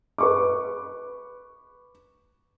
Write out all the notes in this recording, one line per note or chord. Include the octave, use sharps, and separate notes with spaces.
B4 C#6 D6